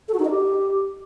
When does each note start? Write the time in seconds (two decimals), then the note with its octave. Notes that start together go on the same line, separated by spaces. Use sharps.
0.08 A4
0.14 F#4
0.19 D#4
0.25 D#5
0.30 G4